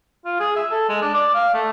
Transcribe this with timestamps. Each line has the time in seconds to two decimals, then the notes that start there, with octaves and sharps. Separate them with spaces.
0.25 F4
0.40 G#4
0.56 E5
0.71 A4
0.89 G#3
1.01 D4
1.14 D5
1.34 F5
1.54 A3